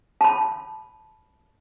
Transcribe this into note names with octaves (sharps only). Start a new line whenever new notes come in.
A5 B5